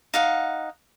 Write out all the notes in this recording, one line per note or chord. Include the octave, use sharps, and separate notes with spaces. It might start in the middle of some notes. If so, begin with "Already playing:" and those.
D#4 F5 F#5